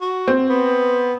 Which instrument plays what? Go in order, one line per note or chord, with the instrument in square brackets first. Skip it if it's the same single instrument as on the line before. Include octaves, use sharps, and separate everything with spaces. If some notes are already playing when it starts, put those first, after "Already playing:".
[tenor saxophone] F#4
[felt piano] C4
[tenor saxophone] B3